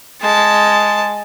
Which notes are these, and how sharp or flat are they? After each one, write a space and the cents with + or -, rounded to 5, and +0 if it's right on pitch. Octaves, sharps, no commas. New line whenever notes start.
G#3 +0 A5 +0